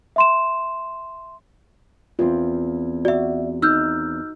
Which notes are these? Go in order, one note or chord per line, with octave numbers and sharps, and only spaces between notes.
E5 C6 E7
E2 C4 F4
F#4 D5 E5
D#4 E6 F6 G6